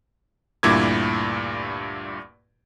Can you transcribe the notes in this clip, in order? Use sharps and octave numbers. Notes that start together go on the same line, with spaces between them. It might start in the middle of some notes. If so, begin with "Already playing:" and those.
D2 G2 A#2 E4 D6 G#6